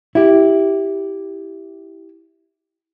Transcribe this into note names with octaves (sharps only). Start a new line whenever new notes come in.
E4 G4